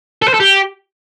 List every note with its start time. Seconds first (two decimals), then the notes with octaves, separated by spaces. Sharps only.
0.22 A4
0.28 C5
0.34 A4
0.40 G4